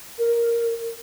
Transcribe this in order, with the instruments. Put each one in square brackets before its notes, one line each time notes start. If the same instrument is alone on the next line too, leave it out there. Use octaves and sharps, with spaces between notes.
[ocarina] A#4